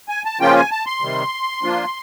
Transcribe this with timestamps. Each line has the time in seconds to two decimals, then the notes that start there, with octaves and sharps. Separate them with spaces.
0.09 G#5
0.25 A5
0.40 C#3 F3 A#3 C#4 F4 G5
0.56 G#5
0.71 A5
0.86 C6
1.01 C3 D#3 G3
1.63 F3 A#3 D4 F4